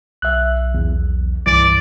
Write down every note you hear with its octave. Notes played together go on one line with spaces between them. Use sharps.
B1 E5 F#6
E2
C2 G2 E3 D5